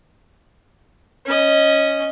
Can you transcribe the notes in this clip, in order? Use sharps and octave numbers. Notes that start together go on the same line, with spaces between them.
C#4 D#5